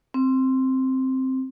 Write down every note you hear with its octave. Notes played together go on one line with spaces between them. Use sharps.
C4